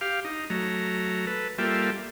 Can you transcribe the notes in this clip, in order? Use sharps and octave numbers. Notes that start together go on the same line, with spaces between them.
G4 F5
D#4
F#3 A3 A#5
A4 B4
G3 A#3 F4 A4 E5 G5